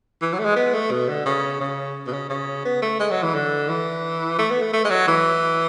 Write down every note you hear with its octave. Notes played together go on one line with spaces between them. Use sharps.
E3
F#3
A3
G#3
B3
A3
B2
D3
C#3
C#3
B2
C#3
C#3
B3
A3
G#3
F#3
E3
D3
E3
A3
B3
A3
A3
G#3
F#3
E3